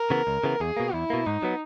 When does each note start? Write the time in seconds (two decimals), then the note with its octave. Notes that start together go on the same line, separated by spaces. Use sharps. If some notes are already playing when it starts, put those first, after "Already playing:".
Already playing: A#4
0.10 C#3 E3 B3
0.27 C#2
0.44 C#3 E3 B3
0.60 E2 G#4
0.77 B2 A#3
0.93 E2 E4
1.10 B2 A#3
1.26 G#2 D#4
1.43 F#3 B3